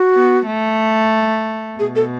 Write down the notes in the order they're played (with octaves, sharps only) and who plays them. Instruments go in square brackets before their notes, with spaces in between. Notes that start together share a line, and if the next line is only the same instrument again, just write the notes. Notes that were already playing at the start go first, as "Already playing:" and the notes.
Already playing: [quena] F#4
[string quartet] B3
A3
[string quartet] B2 [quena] G#4
[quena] A4